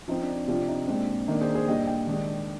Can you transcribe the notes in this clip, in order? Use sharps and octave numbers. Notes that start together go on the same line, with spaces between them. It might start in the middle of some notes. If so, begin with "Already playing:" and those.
F3 C4 D#4
D4
C3 F3 C4 D4 F4
D#4
A#2 G#3 C4 D4
D#3 A#3 D4 D#4
G#4 C5
G#4 C5
A#2 G3 D4 D#5 G5
D#5 G5
D#3 G#3 D4